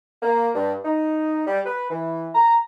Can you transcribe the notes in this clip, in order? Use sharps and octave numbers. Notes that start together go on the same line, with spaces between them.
A#3
G2
D#4
G3
B4
E3
A#5